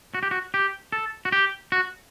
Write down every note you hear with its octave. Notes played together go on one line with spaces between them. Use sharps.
F#4
G4
F#4
G4
A4
F#4
G4
F#4